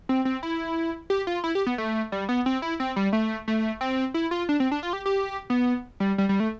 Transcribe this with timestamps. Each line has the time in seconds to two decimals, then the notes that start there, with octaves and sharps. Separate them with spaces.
0.09 C4
0.25 C4
0.43 E4
1.10 G4
1.27 F4
1.44 E4
1.55 G4
1.67 B3
1.78 A3
2.12 G3
2.29 B3
2.46 C4
2.62 E4
2.80 C4
2.96 G3
3.13 A3
3.48 A3
3.81 C4
4.14 E4
4.31 F4
4.49 D4
4.60 C4
4.72 D4
4.83 F4
4.93 G4
5.06 G4
5.50 B3
6.00 G3
6.18 G3
6.29 G3
6.40 A3